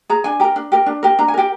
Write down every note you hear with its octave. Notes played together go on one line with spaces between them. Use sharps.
G#4 A#5
D4 G#5
G4 A#4 A#5
D4
G4 A#4
D4
G4 A#4
D4 A#5
G#5
G4 A#4 G5